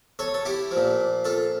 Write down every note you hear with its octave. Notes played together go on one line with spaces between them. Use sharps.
A4 C#5
A4
E4 G4
A#2 F3
F4 A4